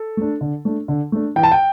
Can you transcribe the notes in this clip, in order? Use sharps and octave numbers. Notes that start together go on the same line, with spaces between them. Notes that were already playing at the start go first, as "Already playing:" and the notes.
Already playing: A4
A3 D4
D3
A3 D4
D3
A3 D4
E3 G5
A5
G5